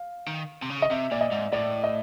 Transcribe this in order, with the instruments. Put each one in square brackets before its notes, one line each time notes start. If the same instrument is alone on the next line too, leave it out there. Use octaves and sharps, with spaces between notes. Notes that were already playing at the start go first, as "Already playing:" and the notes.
Already playing: [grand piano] F5
[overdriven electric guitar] D#3
C3
C#3
[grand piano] D#5
[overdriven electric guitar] C3 [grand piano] E5
[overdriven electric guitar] A#2 [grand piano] D5
[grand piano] D#5
[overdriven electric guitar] G#2
[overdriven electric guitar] A2 [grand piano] D5
[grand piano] D#5